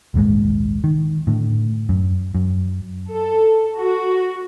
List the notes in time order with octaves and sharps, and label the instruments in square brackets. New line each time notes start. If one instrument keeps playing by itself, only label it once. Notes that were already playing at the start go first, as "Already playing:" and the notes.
[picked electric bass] A#1 D#2 G#2 G#3
D#3
A2 D3
F#2
F#2
[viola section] A4
F#4